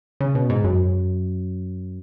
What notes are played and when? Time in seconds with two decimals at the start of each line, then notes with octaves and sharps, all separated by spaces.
0.21 C#3
0.35 B2
0.50 G#2
0.64 F#2